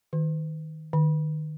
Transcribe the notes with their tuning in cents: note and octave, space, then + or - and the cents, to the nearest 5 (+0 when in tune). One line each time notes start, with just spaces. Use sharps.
D#3 +10
D#3 -25